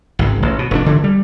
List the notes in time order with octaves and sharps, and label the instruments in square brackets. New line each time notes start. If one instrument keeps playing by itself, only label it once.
[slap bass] G#1 C#2
A1
B2
F1 A2 D4
D3 E3
G3